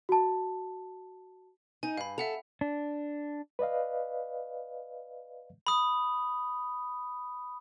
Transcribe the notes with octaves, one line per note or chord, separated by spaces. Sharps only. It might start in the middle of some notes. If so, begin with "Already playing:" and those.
F#4 A5
D#4 G#5
G2 F5 B5
A4 E5 F#5 F7
D4
B4 D5 D#5 F5
B5 D#6